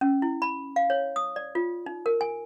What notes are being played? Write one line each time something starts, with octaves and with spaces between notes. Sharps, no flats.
C#4
E4
B5
F5
C#5
D#6
D5
F4
D#4
A#4
G#5